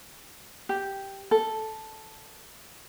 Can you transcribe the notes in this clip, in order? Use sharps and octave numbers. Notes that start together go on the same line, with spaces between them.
G4
A4